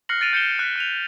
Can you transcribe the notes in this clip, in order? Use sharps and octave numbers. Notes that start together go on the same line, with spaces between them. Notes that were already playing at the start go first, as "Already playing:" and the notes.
F6 F#6 A#6 C7 C#7 F#7
A6 D7 D#7 F7 F#7
G6 C#7 E7 G7
F#6 B6
F#6 D#7 F7